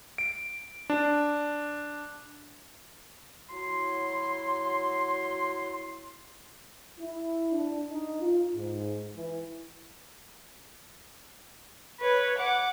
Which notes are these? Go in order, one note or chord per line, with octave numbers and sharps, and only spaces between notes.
D7
D4
F#3 E4 C6
E4
D4
D#4
F4
G#2
E3
B4 C#5
F#5 D6